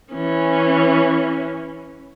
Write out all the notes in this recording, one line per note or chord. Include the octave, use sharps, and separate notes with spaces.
E3 C#4